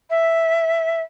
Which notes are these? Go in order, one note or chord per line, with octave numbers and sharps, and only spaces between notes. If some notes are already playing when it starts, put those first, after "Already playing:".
E5